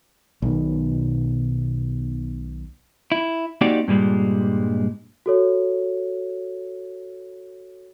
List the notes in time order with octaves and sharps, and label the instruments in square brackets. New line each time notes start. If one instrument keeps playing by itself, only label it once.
[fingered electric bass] B1 B2 D#3
[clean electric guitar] E4
A#3 C4 D#4 F#4 G4 D5
G2 A#2 G3 G#3
[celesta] F#4 A4 C#5